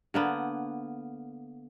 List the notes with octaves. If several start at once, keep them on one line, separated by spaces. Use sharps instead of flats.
D3 A#3 B3